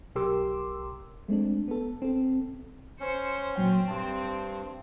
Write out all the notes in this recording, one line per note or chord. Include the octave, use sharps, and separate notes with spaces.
B1 G4 A#4 C6 D6 E6
G#3 A3 C4 D4
B3 A4
C4 A4
C#4 C5 C#7
A#2 F#3 C4 G5
G2 A5 C6